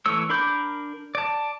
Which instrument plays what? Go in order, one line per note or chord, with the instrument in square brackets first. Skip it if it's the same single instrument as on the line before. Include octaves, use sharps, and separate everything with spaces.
[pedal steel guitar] E3 A3 C#5 E6
D4 A#4 B5 D6 G6
D5 A5